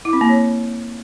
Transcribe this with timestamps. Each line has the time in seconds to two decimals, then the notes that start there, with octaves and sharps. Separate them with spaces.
0.05 E4
0.13 C4
0.21 A#3
0.29 C#5